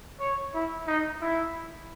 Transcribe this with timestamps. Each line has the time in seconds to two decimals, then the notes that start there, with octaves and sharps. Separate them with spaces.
0.20 C#5
0.54 E4
0.87 D#4
1.21 E4